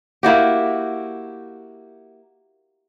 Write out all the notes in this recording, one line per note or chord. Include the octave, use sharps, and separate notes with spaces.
A#3 E4 F#4 G4